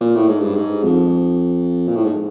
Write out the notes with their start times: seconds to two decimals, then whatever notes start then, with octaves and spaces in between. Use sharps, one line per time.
0.01 A#2
0.15 A2
0.28 G#2
0.42 G2
0.56 G#2
0.84 F2
1.88 A#2
1.96 A2
2.05 G#2